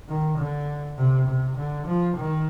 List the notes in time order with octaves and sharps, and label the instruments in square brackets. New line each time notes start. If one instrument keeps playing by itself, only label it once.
[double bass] D#3
D3
C3
C3
D3
F3
D#3